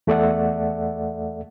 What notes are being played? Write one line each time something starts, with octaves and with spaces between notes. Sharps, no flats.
E2 A3 A4 D5 E5 F#5